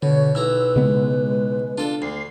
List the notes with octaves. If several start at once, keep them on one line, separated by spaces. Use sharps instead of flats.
B2 D3 C#5
B1 E4 B4 A#5 E6
C#3 G#3 B3
D4 F4 A4
D2 C7